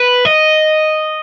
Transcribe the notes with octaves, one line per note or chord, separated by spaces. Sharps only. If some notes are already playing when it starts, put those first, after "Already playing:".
Already playing: B4
D#5